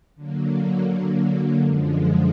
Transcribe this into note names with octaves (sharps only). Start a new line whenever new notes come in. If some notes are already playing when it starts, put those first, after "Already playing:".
D3 F#3 A#3
F#2 D3 F3 G#3